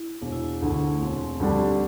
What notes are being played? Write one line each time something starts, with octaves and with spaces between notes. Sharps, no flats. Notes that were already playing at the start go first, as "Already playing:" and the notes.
Already playing: E4
E1 D4
E4
D4
D2 D3
A3
E1 C4
D2 D3 G3 D4